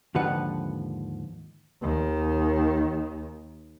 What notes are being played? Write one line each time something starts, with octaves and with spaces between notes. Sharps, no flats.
D#2 G#2 D3 F3 B4 F#5
D#2 D#3